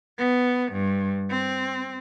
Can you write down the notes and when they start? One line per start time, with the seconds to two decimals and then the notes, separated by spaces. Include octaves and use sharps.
0.18 B3
0.73 G2
1.30 C4